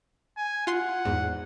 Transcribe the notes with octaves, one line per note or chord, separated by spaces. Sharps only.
G#5
F4 F#5 C6 C7
E2 G#2